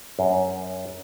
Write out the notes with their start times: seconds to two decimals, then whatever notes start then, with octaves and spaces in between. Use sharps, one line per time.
0.19 F#2